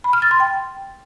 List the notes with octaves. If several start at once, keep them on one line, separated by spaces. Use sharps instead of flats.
B5
F6
A6
C6
G5